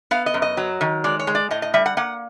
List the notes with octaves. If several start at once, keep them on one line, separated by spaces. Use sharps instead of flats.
B3 F5
D#5
F#2
D#5
F#3
D#3
G#3 D5
C#5
G#3
D5
A2 D#5
D#5
G3 E5
F#5
A#3 F#5